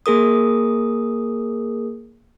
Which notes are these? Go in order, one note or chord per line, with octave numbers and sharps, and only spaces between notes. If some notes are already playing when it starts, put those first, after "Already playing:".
A#3 G#4 A#4 D#6